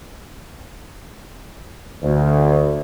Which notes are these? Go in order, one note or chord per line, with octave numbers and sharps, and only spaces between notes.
D2